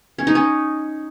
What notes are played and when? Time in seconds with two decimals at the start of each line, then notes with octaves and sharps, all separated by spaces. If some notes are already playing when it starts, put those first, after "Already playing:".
0.19 C#4
0.27 D#4
0.35 C#4